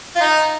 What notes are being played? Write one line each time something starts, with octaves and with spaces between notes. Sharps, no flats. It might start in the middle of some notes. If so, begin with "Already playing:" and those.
F4
D#4